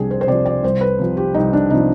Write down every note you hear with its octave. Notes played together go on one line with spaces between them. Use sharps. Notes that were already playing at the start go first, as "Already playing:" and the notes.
Already playing: C2 C3 F3 C4 D4 G4 G#4
C5
C5
C3 F3 D5
D5
C2 C5
B4
C3 F3
G4
C2 D#4
D4
C3 F3 D#4